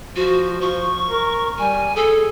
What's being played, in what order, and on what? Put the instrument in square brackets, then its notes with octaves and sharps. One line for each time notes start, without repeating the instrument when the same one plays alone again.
[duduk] F3 [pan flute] F#4
[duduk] F3 [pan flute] C#6
[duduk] A#4
[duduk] G3 [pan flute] G#5
[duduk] G#4 [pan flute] A4